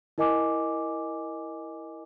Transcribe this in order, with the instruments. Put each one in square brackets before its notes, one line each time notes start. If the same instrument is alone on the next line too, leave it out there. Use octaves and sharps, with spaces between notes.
[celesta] E4 A#4 D#5 G#5 D6